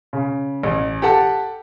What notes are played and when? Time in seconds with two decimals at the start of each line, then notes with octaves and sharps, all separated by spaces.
0.13 C#3
0.63 A1
1.02 G4 A4 F#5 A5